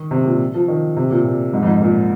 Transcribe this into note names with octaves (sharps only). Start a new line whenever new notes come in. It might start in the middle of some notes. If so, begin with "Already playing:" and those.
Already playing: D#3
C3
A#2
F3
D#3
C3
A#2
A#2
G#2
F2
G#2
A#2